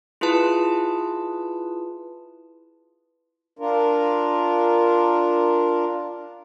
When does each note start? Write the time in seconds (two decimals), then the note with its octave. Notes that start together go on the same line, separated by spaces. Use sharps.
0.21 E4 F4 G#4 B4 A5
3.59 D4 F4 A#4